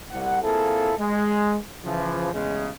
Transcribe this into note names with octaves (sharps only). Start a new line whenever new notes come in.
C2 F#5
A#3 C4 E4 F4 G#4 A4
G#3
C#3 E3 F3
A1 E2 C#3 G#3